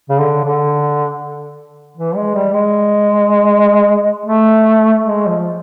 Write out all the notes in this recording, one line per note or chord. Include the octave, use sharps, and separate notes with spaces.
C#3
D3
D3
E3
G#3
G3
G#3
A3
G#3
F3